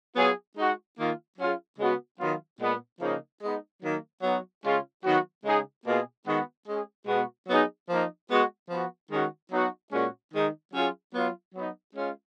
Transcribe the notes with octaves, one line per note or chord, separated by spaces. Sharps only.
F#3 B3 F4 G#4
G#3 D#4 F#4
D#3 A#3 F4
F#3 C#4 F4 G#4
C#3 G#3 B3 F#4
D#3 F#3 B3 F4
A#2 G#3 B3
C#3 F3 A#3 D#4
G#3 B3 D#4
D#3 F#3 A#3
F#3 B3 D#4 F#4
C#3 G#3 C#4 F4
D#3 F#3 B3 F#4
C#3 G#3 D#4 G#4
B2 A#3 F4 G#4
D#3 G#3 B3 F#4
G#3 C#4 G#4
B2 G#3 B3 F#4
F#3 B3 D#4 G#4
F3 A#3 D#4
G#3 B3 F#4
F3 B3 F#4
D#3 G#3 C#4 F#4
F#3 B3 D#4 F#4
A#2 G#3 C#4 F#4
D#3 G#3 D#4
F#3 C#4 F4 G#4
F#3 B3 F4
F#3 B3 D#4
G#3 C#4 F4